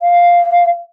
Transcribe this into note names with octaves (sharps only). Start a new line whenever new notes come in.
F5